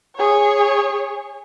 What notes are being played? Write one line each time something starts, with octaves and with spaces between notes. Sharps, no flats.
G#4 C#5